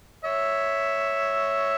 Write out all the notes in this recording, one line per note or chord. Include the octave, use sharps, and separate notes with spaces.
C#5 E5